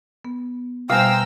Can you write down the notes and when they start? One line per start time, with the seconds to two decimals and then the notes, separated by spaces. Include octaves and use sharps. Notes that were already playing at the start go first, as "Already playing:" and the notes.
0.25 B3
0.90 B2 G3 C5 F5 G5 G#5 A#5 E6